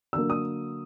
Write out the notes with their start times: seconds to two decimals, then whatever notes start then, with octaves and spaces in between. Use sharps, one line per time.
0.13 D3 F#3 A#3 E6
0.30 D#6